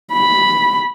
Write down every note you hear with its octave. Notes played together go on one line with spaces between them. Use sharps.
B5